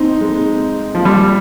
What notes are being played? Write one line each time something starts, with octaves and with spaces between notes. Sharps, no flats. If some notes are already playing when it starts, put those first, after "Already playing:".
Already playing: C4 D#4
G#3
F3
G3